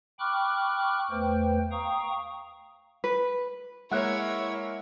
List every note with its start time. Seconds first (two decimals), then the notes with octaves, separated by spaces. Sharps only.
0.19 G5 B5 C#6 D6 F6 F#6
1.11 E2 A3 B4 C5 G5
1.72 F5 G5 A#5 C#6 D#6
3.04 B4
3.92 G#3 A#3 E4 A#4 C#5 F#5 F#6